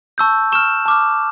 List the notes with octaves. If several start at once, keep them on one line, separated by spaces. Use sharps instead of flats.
A5 C#6 E6 G6
C#6 F6 E7
A5 D6 F6